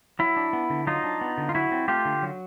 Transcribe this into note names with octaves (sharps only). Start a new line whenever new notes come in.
F#3 E4
D4
B3
D3
F#3 D#4 F4
D4
B3
D3
F4
F#3 E4 F#4
C4
A3 F4 G4
D3
F#3